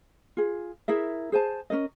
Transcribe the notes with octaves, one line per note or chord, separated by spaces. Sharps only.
F4 G#4
E4 G#4 A#4 E5
G#4 C5 G#5 A5
C#4 D#4 A#4 D#5